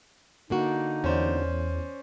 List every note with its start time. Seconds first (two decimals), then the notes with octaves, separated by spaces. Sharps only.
0.50 D3 A#3 D#4 F#4
1.04 E2 C#4 C5 D5